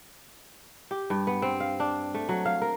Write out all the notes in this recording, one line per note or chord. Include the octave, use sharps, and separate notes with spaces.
G4
G2
B3
C4
F5
D4
A3
F#3
F5
A#4